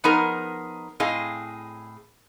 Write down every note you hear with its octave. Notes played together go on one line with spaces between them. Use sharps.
F3 B3 D#4 G#4 A#4
A2 C4 G#4 D#5 F5